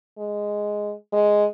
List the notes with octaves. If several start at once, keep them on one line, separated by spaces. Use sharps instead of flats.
G#3
G#3